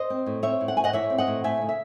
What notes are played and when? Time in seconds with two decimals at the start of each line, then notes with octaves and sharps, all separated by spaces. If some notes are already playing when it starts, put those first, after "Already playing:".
Already playing: C5 D#5
0.10 C4
0.26 A2
0.43 C4 C#5 E5
0.61 A2
0.68 F#5
0.77 A2 G#5
0.84 D#5 F#5
0.93 E3 C#5 E5
1.10 C4
1.18 D#5 F#5
1.27 A2
1.44 A3 E5 G#5
1.62 C#3
1.69 E5